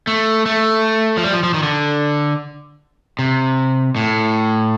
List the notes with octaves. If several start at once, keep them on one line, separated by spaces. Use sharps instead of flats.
A3
A3
F3
G3
F3
F3
D#3
D3
C3
A2